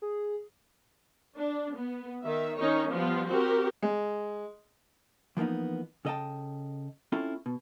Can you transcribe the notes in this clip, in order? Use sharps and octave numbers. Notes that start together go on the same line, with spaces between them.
G#4
D4
B3
D#3 E5
D#3 C#4 D#4 C#5
F3 G3 B3 F4
C4 F#4 G4 A#4
G#3
E3 F3 A#3 B3 D#4
C#3 A4 D#5 E5 G5 A5
C4 C#4 E4 F4 A4
B2